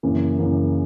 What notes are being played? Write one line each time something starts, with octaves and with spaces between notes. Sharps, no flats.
F#2 C#3 E3 A#3
F#2 C#3 E3 A#3